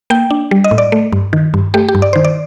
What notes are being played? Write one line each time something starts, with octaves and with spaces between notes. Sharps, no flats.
A#3 G5
D4
G3
D#5
A2
D5
A3
G2
D#3
G2
A3 G4
G4
G2
D5
D#3 C5
D5